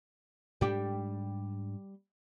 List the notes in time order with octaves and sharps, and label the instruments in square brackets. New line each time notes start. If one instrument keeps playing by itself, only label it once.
[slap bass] G#2 D4 [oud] G3 G4